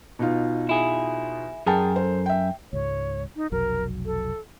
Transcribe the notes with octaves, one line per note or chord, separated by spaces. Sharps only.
B2 D#4 F4
E4 G#4
F#2 G#4 A#4 G5 A5
A4 C5
E5 G5
C#2 G#2 C#5
D#4
F1 B1 F#3 A#4
A4